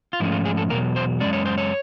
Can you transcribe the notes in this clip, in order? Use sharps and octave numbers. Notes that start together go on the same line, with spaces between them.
F4
G#2 F3 A3 C#4 E4
F4
G#4
A4
E2 B2 F#3 A#4
C5
F#2 D#3 G#3 C#4 D5
C#5
C5
C#5